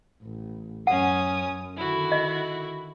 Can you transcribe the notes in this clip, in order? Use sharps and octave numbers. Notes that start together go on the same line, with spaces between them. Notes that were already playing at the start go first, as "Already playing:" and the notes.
A1
F#2 C#4 F#5 D#6
D3 D#3 E4 F#4
D#5